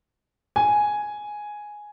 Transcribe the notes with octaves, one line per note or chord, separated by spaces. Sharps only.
G#5